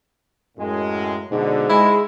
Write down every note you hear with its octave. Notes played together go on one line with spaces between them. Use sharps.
F#2 A2 G#3
G#2 B2 D3
G#3 E4